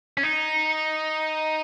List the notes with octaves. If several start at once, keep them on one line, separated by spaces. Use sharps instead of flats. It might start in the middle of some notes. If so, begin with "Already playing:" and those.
C#4
D#4